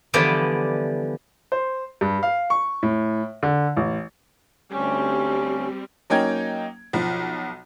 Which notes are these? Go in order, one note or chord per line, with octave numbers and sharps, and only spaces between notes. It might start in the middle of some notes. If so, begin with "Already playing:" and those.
D3 E3 F3 G3 B3 D5
C5
G2
F5
C#6
A2
D3
A1
D2 G3 C4 C#4
F#3 A#3 C#4 D#4 G5 G#6
B1 F3